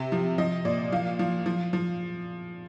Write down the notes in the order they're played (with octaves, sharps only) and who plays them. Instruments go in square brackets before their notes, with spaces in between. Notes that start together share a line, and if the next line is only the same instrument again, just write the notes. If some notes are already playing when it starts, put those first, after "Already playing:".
Already playing: [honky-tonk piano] C3
F3
F3 D#5
A#2 D5
F3 F5
F3
F3
F3